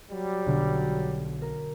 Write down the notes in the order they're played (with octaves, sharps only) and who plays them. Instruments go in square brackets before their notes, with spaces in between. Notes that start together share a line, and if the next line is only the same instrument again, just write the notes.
[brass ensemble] F#3 G3
[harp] B1 D3 F6
A#4